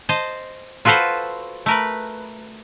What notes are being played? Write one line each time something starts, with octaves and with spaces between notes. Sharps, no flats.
C5 D#5 A5
F4 F#4 A4 B4 C5
A3 A#4 B4